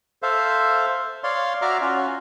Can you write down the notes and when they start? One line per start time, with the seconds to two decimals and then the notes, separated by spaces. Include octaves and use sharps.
0.23 A4 C5 E5 F5
1.24 C#5 D5 F5 C6
1.62 F#4 D5 E5 A#5 D6 F6
1.81 C#4 F4 F#4